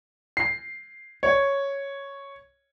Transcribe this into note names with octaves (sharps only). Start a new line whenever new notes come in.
C7
C#5